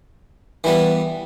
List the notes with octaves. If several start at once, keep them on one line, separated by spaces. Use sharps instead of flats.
E3 G3 B3